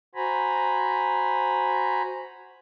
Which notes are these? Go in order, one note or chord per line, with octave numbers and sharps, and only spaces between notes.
F#4 C5 G#5 A#5 B5